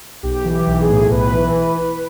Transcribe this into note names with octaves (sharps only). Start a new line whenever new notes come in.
B1 G4
E3
G4
B1
G#4
A2
B1 B4
E3